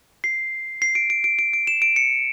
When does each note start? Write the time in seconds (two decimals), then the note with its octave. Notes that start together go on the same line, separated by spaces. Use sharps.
0.24 C7
0.82 C7
0.95 D7
1.10 D7
1.24 D7
1.39 D7
1.53 D7
1.67 E7
1.82 D7
1.96 C#7